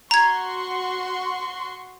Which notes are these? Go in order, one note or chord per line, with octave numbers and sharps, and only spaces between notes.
F#4 A#5 C6 C#6 G#6